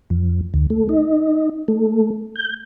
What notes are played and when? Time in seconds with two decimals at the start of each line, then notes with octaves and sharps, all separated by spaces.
0.10 F2
0.54 D2
0.70 A3
0.89 D#4
1.68 A3
2.36 G6